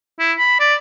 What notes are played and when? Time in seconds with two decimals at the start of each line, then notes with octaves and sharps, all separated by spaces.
0.19 E4
0.38 B5
0.60 D5